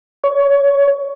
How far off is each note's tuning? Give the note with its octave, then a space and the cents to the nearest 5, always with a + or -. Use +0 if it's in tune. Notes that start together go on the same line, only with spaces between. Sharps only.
C#5 +20